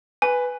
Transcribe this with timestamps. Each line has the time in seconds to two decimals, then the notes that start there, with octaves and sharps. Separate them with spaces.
0.22 B4 G#5